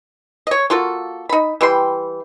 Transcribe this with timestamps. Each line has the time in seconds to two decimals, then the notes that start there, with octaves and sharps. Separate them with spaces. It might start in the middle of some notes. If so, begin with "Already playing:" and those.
0.47 C#5 D#5
0.70 A#3 F4 F#4 A4
1.29 D#4 B5
1.61 E3 G3 G5 C6